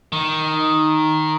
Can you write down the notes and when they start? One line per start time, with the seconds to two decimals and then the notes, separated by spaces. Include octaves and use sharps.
0.12 D#3